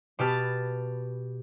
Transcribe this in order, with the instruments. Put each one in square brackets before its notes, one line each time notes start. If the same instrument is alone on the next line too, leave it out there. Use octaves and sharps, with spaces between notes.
[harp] B2 G4 B4 A5 F6 A6